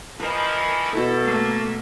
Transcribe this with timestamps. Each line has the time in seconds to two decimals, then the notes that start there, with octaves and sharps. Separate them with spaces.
0.20 E3 F3 A#4 B4 D#5
0.93 B2 E4 F#4 A4 A#5
1.23 A3 A#3